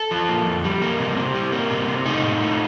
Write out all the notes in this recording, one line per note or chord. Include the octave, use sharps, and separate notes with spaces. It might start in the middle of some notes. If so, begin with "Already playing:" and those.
Already playing: A4
F3
A#3
F2
G3
A#3
C3
C3
G3
A#3
C3
C3
A3 D#4
A2
A3